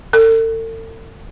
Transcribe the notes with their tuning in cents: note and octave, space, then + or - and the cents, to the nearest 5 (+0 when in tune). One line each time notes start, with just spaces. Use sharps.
A4 +40